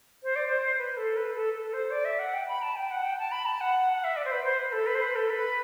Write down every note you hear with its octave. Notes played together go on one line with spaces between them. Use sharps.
C5
D5
C5
B4
A4
B4
A4
A4
C5
D5
E5
F#5
G5
B5
A5
G5
F#5
G5
A5
B5
A5
F#5
F#5
E5
D5
C5
B4
C5
B4
B4
A4
B4
C5
B4
A4
B4